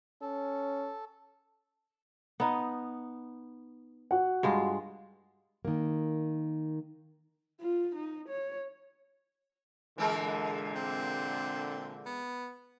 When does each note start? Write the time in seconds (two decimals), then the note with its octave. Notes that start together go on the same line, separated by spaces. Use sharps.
0.22 C#4 A4
2.40 B3 D#4
4.11 F#4 F#5
4.43 G2 G#3 F4
5.65 D#3 A#3
7.61 F4
7.95 D#4
8.29 C#5
9.98 A#2 D3 E3 G#3 A#4
10.75 C4
12.06 B3